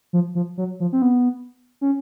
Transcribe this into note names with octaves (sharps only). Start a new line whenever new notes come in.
F3
F3
F#3
F3
C4
B3
C#4